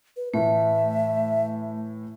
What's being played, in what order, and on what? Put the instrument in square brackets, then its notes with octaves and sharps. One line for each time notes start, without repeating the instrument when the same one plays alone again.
[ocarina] B4
[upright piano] A2 E3 [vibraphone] A3 [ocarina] E5